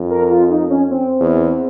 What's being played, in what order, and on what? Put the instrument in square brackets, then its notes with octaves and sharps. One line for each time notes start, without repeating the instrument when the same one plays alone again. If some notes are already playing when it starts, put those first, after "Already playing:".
Already playing: [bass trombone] F2
[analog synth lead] A#4
F4
D#4
C#4
C4
[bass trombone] E2